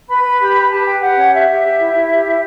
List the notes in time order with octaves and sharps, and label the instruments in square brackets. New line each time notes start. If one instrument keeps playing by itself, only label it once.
[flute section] B4 B5
B4
G4
B4
G4 A5
B4 G5
G4 F#5
C#4
G4 E5
G4
G4
E4
E4
G4
E4